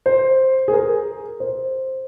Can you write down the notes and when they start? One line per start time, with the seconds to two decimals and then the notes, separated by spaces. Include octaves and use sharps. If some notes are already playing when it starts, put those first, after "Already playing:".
0.06 C5
0.68 G#4
0.73 A#4
1.40 C5